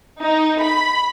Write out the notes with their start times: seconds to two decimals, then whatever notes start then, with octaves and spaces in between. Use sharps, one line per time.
0.21 D#4
0.61 B5